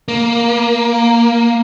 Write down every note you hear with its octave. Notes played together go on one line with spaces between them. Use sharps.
A#3